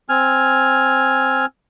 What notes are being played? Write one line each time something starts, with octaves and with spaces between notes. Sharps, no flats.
C4 G#5 F6